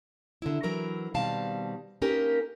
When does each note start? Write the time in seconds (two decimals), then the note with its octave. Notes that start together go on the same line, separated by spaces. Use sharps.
0.42 D3 D#3 E4
0.63 E3 F#3 E4 A#4 A#5
1.14 B2 D#3 G3 C4 F5 A5
2.02 A#3 C#4 D#4 G4 A#4 B4